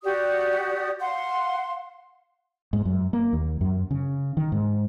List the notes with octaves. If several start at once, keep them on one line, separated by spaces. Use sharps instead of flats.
F#4 G4 D5 D#6
F5 F#5 C6
G#2
F#2
A#3
D#2
F#2
C#3
D#3
G#2